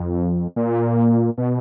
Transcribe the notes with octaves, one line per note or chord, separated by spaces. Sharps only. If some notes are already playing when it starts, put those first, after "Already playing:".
Already playing: F2
A#2
B2